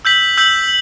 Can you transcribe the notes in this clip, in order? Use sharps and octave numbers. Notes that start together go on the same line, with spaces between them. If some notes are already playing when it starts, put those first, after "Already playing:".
E6 G6 B6 F#7
E6 G6 B6 F#7